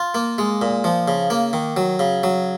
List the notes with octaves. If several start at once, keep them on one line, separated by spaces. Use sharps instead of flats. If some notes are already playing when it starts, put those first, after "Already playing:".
Already playing: F4
A#3
G#3
A#2
F3
C#3
A#3
D#3
F#3
C#3
F#3